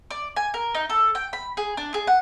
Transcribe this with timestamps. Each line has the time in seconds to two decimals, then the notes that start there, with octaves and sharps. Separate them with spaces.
0.10 D5
0.36 G#5
0.54 A#4
0.75 D#4
0.89 A4
1.15 G5
1.33 B5
1.57 G#4
1.77 D4
1.94 G#4
2.07 F#5